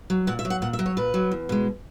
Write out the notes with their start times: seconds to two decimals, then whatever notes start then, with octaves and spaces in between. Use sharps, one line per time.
0.10 F#3
0.27 A#2 F#5
0.39 E5
0.45 F#3
0.50 F#5
0.62 A#2 F#5
0.73 E5
0.79 F#3
0.86 C#5
0.97 A#2 B4
1.14 F#3
1.32 E2
1.49 B2 G#3